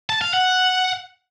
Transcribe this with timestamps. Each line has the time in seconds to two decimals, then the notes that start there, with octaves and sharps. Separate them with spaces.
0.10 A5
0.22 F5
0.33 F#5